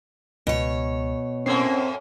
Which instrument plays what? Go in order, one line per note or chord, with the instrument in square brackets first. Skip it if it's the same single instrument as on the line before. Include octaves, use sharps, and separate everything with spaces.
[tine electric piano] C#2 [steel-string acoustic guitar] B2 C#5
[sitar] F#2 A2 A#3 [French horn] C4 [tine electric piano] C#4 C7